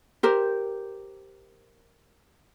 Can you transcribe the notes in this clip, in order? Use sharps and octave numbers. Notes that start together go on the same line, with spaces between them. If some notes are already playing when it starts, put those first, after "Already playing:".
G4 A#4 C5